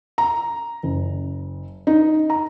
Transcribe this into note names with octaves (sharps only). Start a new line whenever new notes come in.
A#5
F#1
D#4
A#5